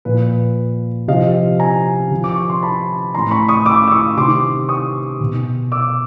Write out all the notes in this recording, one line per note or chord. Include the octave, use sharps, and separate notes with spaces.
A#2 F3 B4
C3 F3 D#5 F5
G#5 A#5
C3 F3
D6
C#6
C6
A5 B5
A2 E3 A#5 C6
B5 C#6
C#6 D#6
D6 E6
E6
C#6 D#6
C3 D#3 C6 D6
C#6 D#6
B2
D6 E6